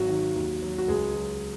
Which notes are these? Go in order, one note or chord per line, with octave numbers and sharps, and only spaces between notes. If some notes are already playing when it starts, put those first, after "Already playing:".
Already playing: G#1 F#3 F#4
D#3
D#2
F#3
F#4
C#2 G#3 G#4
F#3